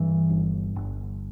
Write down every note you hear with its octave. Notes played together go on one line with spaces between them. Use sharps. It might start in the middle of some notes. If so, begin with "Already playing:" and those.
Already playing: G2 E3
G1
G1